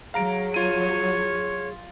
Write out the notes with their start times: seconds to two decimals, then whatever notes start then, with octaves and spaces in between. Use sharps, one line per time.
0.14 F#3 G#4 F5 A#5 D7
0.54 F4 C#5 D#7